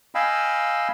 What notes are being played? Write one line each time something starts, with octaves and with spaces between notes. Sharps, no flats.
D#5 F5 G5 G#5 B5 E6